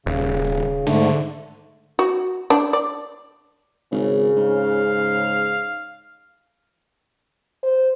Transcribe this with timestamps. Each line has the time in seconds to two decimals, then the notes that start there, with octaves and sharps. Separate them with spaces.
0.06 D#1 C#3
0.86 G#2 D3 A3
1.99 F#4
2.50 D4
2.73 D5
3.92 G#1 C#3
4.37 G#2 F5
7.63 C5